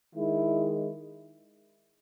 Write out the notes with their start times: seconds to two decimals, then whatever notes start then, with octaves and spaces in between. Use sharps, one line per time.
0.15 D#3 G#3 E4